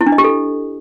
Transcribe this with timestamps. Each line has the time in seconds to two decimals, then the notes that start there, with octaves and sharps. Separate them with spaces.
0.01 E4
0.06 D4
0.12 D#5
0.18 G4
0.24 A4